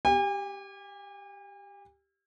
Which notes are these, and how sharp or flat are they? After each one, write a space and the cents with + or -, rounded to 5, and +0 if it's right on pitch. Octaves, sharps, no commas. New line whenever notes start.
G4 +0 G#5 -45